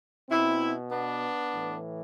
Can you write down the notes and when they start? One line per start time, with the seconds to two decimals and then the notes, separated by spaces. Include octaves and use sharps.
0.29 B2 C4 E4
0.91 B3 D4
1.52 A2 E3